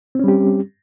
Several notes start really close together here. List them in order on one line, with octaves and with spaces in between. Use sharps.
C4 C#4 G3 G4